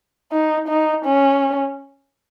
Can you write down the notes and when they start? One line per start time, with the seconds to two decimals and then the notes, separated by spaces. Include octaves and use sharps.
0.32 D#4
0.68 D#4
1.05 C#4